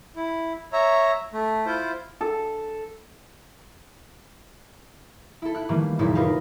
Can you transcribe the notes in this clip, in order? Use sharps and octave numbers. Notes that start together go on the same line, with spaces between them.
E4
C#5 E5 A#5
A3
E4 F4 C5
A4
E4 A4
E4 F#6
D#3 E3 G3 A3 A#3
F#1 D#2 A#2 D#4 E4
D4 D#4 F4 G4 A#4 B4